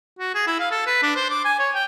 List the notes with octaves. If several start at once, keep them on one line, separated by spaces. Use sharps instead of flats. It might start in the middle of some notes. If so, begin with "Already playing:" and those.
F#4
G#4
E4
F5
A4
B4
D4
C5
D6
G#5
C#5
G5